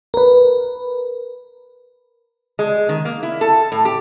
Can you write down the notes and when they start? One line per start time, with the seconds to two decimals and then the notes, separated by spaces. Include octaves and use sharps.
0.14 A#4 B4
2.59 G#3
2.89 D#3
3.05 A#3
3.23 E4
3.41 A4
3.72 A2
3.85 G4